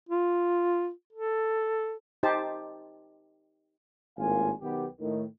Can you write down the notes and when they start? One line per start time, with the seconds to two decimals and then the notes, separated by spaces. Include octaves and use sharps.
0.09 F4
1.13 A4
2.23 D#4 G4 C5 A5
4.18 G#1 A2 A#3 F4 F5 G#5
4.61 B1 D#3 B3 G4
5.00 A2 D#3